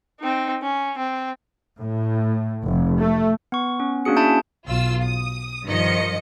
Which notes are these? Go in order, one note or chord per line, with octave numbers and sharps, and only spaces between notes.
C4 D#4
C#4
C4
A2
F1
A3
B3 C#6
B3 C#4
A#3 C#4 D4 F#4 G#4 C#7
E4 E5 G#5 A5 G6 D7
B1 F4 E6
D#6
G2 D#3 F3 D#5 C#7